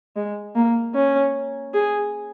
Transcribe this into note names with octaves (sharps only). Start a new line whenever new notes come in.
G#3
A#3
C#4
G#4